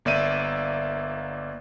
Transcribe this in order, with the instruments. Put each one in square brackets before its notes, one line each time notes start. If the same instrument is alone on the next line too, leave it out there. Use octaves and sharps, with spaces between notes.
[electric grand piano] G1 A#3 D5 E5 D#7